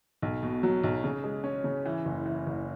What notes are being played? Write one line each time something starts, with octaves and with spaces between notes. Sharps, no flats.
B1
B2
F#3
B1
C#3
G#3
C#4
C#3
E3
F#1
E3
F#1